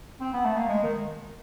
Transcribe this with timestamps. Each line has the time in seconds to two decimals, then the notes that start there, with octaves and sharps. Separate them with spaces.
0.21 C4
0.33 B3
0.45 A3
0.57 A#3
0.68 G#3
0.83 D#3